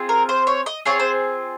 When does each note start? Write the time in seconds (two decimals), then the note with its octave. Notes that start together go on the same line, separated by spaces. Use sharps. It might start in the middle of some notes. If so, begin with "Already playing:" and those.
Already playing: C4 F4 G#4
0.09 A#4
0.29 C5
0.47 C#5
0.66 D#5
0.85 C4 F4 G#4 C#5
1.00 C5